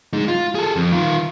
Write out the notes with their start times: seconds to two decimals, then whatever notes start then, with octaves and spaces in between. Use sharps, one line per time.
0.13 G#3 D#4
0.28 F4
0.55 G#4 A4
0.76 F2
0.92 D#3 F4